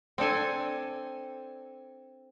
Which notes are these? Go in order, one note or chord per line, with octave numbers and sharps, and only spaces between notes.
C4 D4 A4 G#5